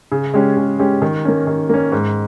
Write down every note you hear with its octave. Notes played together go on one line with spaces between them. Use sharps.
C#3
G#3 C#4 G4
C#3
G#3 C#4 G4
D#3
A#3 C#4
D#3
A#3 C#4
G#2